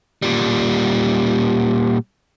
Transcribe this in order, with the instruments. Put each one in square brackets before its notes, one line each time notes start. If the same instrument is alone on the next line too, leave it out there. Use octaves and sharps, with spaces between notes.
[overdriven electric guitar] A#2 G3